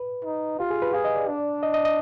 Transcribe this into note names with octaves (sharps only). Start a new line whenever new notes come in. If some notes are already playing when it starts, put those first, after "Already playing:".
Already playing: B4
D#4
F4 G4
G#4
B4
G#4 F5
D#5
D5
D4
D#5
D#5
D#5